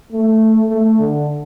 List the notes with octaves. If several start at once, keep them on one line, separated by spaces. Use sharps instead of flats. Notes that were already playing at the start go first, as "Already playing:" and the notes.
A3
A3
D3